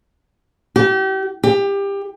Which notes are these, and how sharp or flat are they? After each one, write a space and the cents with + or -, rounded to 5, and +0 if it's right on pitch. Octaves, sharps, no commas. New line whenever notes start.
G4 -35
G4 +25